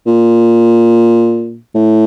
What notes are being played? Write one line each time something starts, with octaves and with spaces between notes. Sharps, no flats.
A#2
A2